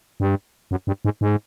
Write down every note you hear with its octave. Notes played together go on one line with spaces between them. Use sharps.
G2
F#2
G2
G#2
G#2